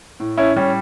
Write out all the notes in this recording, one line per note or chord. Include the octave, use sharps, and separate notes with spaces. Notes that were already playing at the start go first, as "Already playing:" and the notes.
A2
C#4 E4
G3 C#4